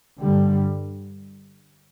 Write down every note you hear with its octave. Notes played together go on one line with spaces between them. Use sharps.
G2 D3 G3